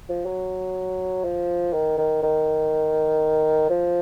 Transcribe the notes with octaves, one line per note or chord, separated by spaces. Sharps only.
F3
F#3
F3
D#3
D#3
D#3
F3